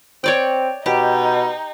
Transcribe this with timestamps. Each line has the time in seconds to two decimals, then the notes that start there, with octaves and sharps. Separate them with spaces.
0.24 C4 C#5 D5 G5
0.86 B2 D#4 G4